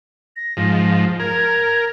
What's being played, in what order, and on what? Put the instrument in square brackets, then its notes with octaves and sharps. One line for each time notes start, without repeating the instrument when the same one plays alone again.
[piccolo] A#6
[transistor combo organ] G#2 F3
[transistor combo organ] A#4 [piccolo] G#6